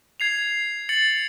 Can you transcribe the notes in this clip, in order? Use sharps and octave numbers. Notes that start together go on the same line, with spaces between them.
G#6 C7 F7
A6 C#7 F#7